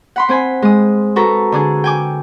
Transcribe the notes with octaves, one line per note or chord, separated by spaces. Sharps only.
F#5 B5 C6
C4 C5 G#5 B5
G#3 D#6
F#4 A4 B4 A#5
D3 D4 G#4
G5 G#5 D6